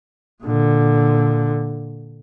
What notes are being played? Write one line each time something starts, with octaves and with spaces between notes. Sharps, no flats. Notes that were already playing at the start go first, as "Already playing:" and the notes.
A#2 D3